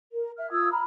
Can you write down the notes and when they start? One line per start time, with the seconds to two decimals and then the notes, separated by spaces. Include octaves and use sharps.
0.13 A#4
0.38 E5 F6
0.51 F4 D#6 E6 G#6
0.71 A#5 B5 F6